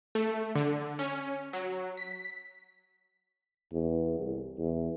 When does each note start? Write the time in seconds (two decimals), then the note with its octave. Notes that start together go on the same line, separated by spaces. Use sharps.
0.15 A3
0.55 D3
0.99 C#4
1.53 F#3
1.97 B6
3.72 E2
4.19 C2
4.58 E2